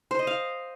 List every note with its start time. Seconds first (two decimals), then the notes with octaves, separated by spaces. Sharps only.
0.11 C5
0.19 D#5
0.27 F5